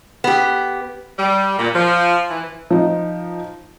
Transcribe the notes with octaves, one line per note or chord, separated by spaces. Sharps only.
B3 G4
G3
A#2
F3
E3
F3 D#4